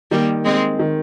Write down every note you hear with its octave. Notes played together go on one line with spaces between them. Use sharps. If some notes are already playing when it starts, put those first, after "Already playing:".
D#3 G3 A#3
G#3 C4
D#3